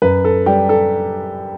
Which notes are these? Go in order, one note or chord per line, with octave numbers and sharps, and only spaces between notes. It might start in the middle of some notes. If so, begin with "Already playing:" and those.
F#2 B4
A4
G3 G4
A4